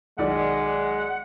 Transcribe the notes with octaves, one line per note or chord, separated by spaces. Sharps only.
B1 D#3 G#3 D5 F#5